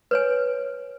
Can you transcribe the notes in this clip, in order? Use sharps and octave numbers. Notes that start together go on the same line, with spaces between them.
B4 C#5 G#5